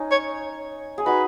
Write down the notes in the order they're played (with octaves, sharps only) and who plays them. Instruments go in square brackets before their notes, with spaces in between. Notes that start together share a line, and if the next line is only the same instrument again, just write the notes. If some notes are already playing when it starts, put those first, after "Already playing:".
Already playing: [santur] C#4 D#4
[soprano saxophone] C#5
[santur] G#4
[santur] D#4 F#4 [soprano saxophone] B4